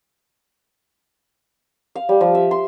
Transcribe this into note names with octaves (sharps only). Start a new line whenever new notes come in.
F5
G3
F3
E5
C6